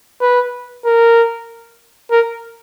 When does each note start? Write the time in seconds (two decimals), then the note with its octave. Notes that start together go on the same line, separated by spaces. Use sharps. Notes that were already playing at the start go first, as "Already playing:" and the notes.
0.21 B4
0.85 A#4
2.11 A#4